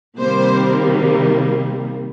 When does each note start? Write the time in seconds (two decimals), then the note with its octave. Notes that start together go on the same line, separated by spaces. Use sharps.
0.17 C3 D#3 G3 A#3 C5